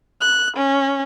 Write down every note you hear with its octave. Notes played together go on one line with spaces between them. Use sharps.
F#6
C#4